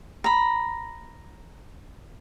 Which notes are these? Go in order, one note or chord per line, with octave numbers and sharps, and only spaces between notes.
A#5 B5